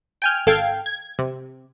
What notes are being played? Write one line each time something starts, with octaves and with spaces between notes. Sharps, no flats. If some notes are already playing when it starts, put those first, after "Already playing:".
G5 G#5 F6
G#1 A4 F5 G5 G#6
G#6
C3